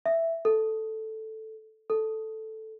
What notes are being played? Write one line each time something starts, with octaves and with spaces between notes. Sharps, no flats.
E5
A4
A4